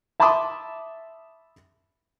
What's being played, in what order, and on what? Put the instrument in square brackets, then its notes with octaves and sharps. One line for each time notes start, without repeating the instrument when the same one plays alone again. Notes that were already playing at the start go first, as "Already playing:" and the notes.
[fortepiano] E5 A5 B5 C6 D6 D#6